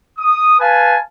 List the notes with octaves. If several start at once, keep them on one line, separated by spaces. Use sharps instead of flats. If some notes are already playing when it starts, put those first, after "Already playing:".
D#6
B4 F5 G#5 A5